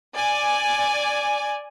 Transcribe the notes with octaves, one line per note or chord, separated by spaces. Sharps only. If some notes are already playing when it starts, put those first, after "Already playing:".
D5 G#5